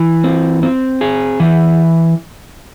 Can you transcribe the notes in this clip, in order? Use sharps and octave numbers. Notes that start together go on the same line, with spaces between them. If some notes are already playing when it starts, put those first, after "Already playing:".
Already playing: E3
C4
C4
G#4
E3